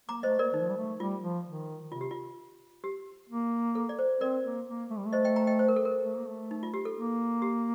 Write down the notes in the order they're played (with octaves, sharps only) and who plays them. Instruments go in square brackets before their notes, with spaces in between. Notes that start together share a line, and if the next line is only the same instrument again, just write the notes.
[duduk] A#3 [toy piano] A#5 D6
[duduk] A3 [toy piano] C5 D#5
[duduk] A#3 [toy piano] A#4 D5
[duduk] D#3 [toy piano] D#4
[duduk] F3
G3
A3
[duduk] G3 [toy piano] F4
[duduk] F3
D#3
[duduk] C3 [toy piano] F4
[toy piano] G4
F4
G4
[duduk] A#3
[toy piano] A4
D5
C5
[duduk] C4 [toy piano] A#4 D5
[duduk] A#3
A#3
A3
G3
A3
[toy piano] C5 D#5
D#5 G5
G5 A#5
D#5 G5
C5
A#4
A4
A#4
[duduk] A3
A#3
A3
[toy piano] D#4
F4
G4
A4
[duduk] A#3
[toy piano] G4